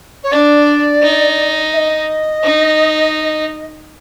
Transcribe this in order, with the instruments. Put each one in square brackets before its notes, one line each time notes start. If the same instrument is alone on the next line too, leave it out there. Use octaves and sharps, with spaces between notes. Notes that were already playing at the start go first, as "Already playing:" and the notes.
[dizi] C#5
[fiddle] D4 [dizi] D5
[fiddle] D#4
[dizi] E5
D#5
[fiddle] D#4